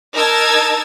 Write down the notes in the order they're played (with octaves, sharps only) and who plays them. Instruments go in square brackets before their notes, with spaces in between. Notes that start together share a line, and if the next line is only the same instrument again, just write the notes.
[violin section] D#4 A#4 A5 E6 G#6 A6